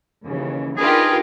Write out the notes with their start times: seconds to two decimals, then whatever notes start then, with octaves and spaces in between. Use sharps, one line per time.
0.24 D#2 C#3 E3
0.77 D4 D#4 F4 G4 G#4 A#4 B4